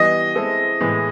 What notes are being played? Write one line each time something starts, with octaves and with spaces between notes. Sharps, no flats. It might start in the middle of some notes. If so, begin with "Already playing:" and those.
Already playing: E3 G3 B3 D#5
G#3 C4 E4 A4
A2 E3 G#3